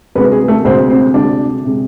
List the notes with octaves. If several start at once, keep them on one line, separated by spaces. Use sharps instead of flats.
D2 C3 G#3 B3 B4
G#4
A3 A4
D2 C3 G#3 C4 C5
C4 C5
D2 C3 G#3 D4 D5
C3 G#3